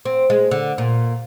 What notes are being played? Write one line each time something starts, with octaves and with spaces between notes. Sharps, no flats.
C4
G#3
D3
A#2